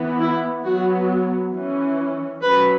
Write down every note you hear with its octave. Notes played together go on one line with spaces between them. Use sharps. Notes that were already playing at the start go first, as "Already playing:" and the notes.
Already playing: E3 B3
E4
F#3 B3 F#4
E3 C#4
F#3 C#4 B4